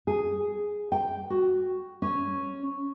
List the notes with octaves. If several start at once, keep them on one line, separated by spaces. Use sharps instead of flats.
G#4
G5
F#4
C#4